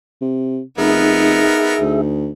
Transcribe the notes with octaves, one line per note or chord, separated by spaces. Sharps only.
C3
F1 B3 D#4 G#4 A#4 E5
D2